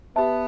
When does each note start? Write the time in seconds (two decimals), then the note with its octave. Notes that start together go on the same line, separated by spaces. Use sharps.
0.16 B3 G4 B4 E5 A5